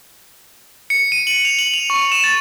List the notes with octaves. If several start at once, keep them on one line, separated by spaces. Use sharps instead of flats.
C#7
D#7
F#7
F7
F#7
F7
C#6
E7
A6